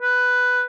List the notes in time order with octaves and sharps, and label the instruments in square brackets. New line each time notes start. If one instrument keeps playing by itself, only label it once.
[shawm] B4